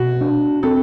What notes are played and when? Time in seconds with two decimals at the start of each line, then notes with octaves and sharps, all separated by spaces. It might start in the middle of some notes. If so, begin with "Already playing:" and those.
Already playing: B2 F#4
0.21 D4
0.63 C4 A4